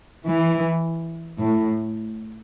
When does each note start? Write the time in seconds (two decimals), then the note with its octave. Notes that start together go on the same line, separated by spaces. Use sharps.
0.26 E3
1.39 A2